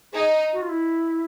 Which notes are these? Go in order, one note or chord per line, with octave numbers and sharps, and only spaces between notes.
D#4 G#4
F#4
F4
E4